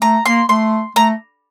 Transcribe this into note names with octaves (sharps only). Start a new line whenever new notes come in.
A3 A#5
A#3 C6
A3 C6
A3 A#5